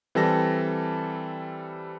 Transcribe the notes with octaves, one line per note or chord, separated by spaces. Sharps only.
E3 G3 C4 A4 A5 A#6